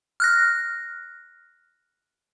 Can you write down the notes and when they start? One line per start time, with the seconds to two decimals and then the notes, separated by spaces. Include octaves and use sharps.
0.20 F6 F#6 A#6